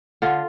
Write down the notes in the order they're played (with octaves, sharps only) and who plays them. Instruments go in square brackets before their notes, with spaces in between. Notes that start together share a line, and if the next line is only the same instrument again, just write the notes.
[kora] D3 F4